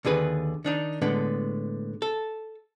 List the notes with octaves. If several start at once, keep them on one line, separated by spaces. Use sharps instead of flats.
D#2 D3 G#4 B4
D#3 D4 D#4
A2 D3 G#3 B3
A4